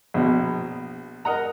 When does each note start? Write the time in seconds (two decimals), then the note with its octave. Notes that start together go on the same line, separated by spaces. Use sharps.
0.14 A#1 B2
1.25 A#4 D#5 F#5 A#5